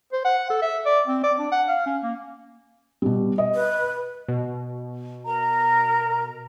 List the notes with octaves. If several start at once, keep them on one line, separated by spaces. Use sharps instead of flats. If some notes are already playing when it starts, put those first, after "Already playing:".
C5
F#5
A4
E5
D5
C4
D5
D4
F#5
F5
C#4
A#3
B2 G3
D#5
B4
B2
A#4 A#5